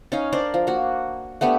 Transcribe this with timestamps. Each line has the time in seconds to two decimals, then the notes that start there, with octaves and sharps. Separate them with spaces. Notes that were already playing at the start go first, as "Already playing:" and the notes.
0.12 C#4 D#4 F5
0.32 D4 A#4 C5 D5
0.54 F3
0.67 A#3 F#4
1.41 A3 B3 D4 G4